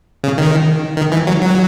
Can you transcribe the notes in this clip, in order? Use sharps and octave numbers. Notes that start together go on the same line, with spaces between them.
C#3
D#3
D#3
E3
F#3
F#3